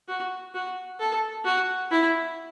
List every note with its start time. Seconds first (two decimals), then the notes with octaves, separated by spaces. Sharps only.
0.08 F#4
0.54 F#4
1.00 A4
1.45 F#4
1.91 E4